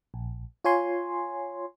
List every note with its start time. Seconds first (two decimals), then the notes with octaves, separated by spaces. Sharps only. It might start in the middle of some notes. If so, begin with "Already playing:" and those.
0.14 A#1
0.64 F4 C#5 G#5 C6